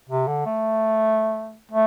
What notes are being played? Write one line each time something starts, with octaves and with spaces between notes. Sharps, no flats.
C3
D3
A3
A3